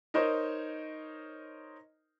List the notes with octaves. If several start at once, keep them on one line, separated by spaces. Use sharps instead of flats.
D#4 A#4 C5 C#5 D#5